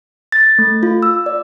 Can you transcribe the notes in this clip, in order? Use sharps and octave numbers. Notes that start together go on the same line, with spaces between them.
A6
A3
F4
E6
D5